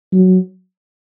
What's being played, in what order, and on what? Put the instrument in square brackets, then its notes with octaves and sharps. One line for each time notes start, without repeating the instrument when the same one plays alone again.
[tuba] F#3